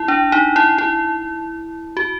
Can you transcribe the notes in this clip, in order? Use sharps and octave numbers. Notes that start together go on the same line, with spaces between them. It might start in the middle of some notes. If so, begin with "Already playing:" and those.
Already playing: E4
D4
D#4
E4
E4
F#4